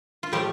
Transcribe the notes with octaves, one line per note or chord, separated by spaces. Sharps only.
F4
A2 F3 G3 A3 G4